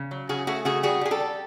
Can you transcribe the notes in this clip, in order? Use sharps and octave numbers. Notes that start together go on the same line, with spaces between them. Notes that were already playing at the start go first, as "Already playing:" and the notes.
Already playing: C#3
F#3
C#3 F#4 G#4
A3 F#4 G#4
C#3 F#4 G#4
G3 F#4 G#4
G3 G#4
G4 A4
G3